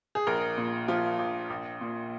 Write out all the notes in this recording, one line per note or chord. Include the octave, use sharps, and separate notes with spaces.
G#4
A#1 A#4
A#2
F3 F4
A#1
A#1
A#2